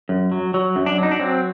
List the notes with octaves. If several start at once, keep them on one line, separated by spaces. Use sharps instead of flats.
F#2
F#3
F#3
F#2
D4
F#3 D#4
D4
F#3 C4